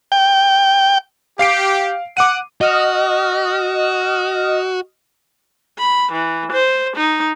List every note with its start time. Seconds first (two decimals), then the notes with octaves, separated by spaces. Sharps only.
0.12 G5
1.39 G4 F5 C7 D7
2.17 F#5 D6 D#7
2.61 F#4 D#5 F6
5.79 B5
6.12 E3
6.53 C5
6.97 D#4